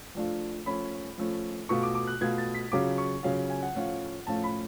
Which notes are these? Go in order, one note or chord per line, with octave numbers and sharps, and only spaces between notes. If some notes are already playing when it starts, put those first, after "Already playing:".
F3 A3 D4 F4
F3 A3 C#4 B5
F3 A3 C#4
B2 A3 F4 C#6
D6
D6
F#6
B2 A3 F4 G#6
A6
B6
C#3 F#3 C#4 F4 D6
C#6
C#3 F#3 C#4 F4 F5
G#5
F#5
A2 F3 A3 C#4 F4
A2 F3 A3 C#4 F4 A5
B5